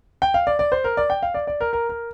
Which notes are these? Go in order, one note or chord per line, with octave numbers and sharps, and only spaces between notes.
G5
F5
D5
D5
C5
A#4
D5
G5
F5
D5
D5
A#4
A#4
A#4